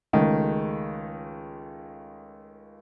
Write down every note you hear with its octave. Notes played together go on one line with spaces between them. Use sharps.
C#2 D#3 G#3 A3